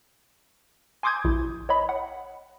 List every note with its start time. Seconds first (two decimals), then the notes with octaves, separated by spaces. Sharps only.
1.03 G#5 C6 D6 D#6 G6 G#6
1.25 A#1 E4
1.69 C#5 D#5 B5
1.89 F#5